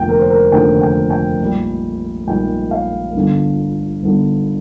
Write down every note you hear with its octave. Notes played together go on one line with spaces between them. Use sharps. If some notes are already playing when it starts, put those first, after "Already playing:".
Already playing: F1 D#2 D3 F3 G5
A#4
C5
A#4
F1 D#2 D3 F3 G5
G5
G5
A#1 G#2 G3
A#1 G#2 G3 G5
F5
G1 G2 D3
G1 G2 D3